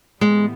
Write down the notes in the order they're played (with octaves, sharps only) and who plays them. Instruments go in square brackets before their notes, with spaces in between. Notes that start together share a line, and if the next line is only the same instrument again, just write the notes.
[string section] A2 E3 G3 B3 [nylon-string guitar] G#3